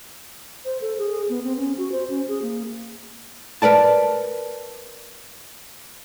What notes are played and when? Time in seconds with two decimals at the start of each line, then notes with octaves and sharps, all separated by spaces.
0.65 C5
0.81 A4
0.98 G#4
1.29 B3
1.44 C4
1.57 C#4
1.78 F#4
1.92 C5
2.10 C#4
2.28 G#4
2.42 A#3
3.62 A#4 B4 D5 A5